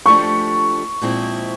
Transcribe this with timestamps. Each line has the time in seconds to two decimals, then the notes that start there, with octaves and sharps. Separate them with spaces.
0.06 F3 A3 D4 G4 C#6
1.02 A#2 F3 G#3 C4 E4